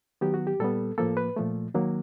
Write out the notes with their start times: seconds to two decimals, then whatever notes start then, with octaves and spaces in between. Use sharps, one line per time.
0.21 D#3 F#3 B3 G4
0.34 F#4
0.47 G4
0.60 A#2 G3 B3 A4
0.98 A2 F3 A#3 A4
1.17 B4
1.36 A#2 F3 A3
1.74 D#3 F#3 A#3